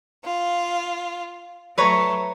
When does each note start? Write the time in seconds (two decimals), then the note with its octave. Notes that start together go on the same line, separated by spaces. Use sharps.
0.23 F4
1.78 F#3 A3 B4 C#5 A#5